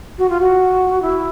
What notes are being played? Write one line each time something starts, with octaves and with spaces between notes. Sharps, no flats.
F#4
F4
F#4
E4